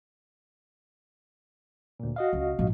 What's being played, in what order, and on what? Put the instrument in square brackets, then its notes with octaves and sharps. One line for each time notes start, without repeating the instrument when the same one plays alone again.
[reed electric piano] D2 A#2
F#4 D#5 F5
[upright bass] C#2
A#1 G#2